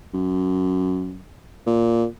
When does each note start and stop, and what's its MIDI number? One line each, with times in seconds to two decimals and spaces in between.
0.14 1.21 42
1.66 2.06 46